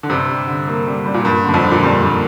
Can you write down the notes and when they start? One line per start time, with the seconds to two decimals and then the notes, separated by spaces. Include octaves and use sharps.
0.03 D3
0.10 G2 C3 G3
0.29 G3
0.47 D3
0.68 A#3
0.87 G3
1.06 G3
1.14 A#2
1.25 G2 A#3
1.44 G2 D3
1.54 F2
1.64 D3
1.71 A#2
1.83 G2 G3
2.02 G2 A#3